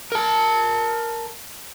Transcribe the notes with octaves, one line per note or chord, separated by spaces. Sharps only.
A#4 A5